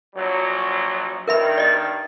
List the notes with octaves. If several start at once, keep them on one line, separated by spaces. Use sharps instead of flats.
A#1 F#3
G2 D#3 A#4 E5 B5
D5 D#5